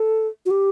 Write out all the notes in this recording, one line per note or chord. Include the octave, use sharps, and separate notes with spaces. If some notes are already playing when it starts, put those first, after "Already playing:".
Already playing: A4
F#4
G4